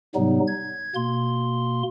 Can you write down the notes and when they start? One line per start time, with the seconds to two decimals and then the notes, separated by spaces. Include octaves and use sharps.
0.15 G#2 C3 F#3 G3 B3 D#4
0.48 G#6
0.95 B2 A#3 C6